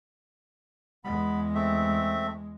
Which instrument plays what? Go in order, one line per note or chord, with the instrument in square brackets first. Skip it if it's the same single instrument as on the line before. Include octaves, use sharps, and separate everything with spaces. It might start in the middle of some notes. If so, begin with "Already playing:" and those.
[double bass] E2 G#3 [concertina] B3 B5
[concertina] A3 C4 E5